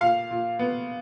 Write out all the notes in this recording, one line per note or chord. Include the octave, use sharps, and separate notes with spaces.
A#2 F5
A#2
B3